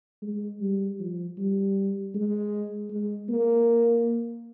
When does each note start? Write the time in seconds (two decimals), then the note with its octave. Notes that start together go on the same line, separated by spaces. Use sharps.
0.22 G#3
0.61 G3
0.99 F3
1.38 G3
2.15 G#3
2.90 G#3
3.29 A#3